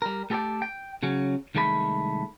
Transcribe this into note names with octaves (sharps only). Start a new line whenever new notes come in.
G3 A#4
A3 G4 A4 A#4 D5 G5
G5
C#3 F#3 C#4
C2 D#3 G#3 A3 A4 B5